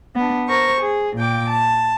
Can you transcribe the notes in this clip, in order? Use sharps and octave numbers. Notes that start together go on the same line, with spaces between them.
B3 D4
A#4 C5 C#6
G#4
A#2 G5 D6
A5